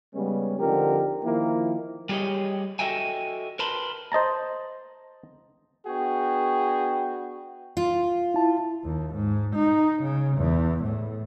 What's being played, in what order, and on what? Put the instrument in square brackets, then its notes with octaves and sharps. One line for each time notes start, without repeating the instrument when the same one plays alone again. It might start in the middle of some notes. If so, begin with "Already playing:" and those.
[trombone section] C#3 G3 G#3 B3 C#4
D3 F3 C4 D#4 G4 A#4
D#3 F3 A#3 E4
[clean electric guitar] G3 G4 G#4 C5 C#5 D#5
F#4 A4 D#5 E5 G5 G#5
A#4 B4 A5 B5 C6
[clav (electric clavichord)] C5 D#5 A5 A#5
[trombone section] B3 D4 F#4 [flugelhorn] G#4 [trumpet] G5
[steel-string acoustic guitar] F4
[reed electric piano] E4 A5
[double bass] D#2
G#2
D#4
C#3
E2
A2